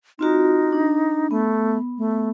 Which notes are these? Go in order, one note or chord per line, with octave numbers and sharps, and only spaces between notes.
C4 D#4 F4 F#4
D4
A3 B3
A3